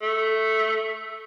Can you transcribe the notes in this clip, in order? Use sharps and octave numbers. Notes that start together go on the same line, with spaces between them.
A3